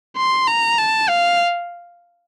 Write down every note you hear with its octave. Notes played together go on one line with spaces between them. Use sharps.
C6
A#5
A5
F5